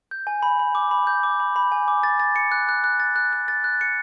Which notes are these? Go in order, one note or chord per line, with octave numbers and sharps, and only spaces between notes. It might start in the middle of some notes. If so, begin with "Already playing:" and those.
G6
G#5
B5
B5
D6
B5
G6
D6
B5
B5
G#5
D6
A6
A6
C#7
F#6
F#6
F#6
A6
F#6
F#6
A6
F#6
C#7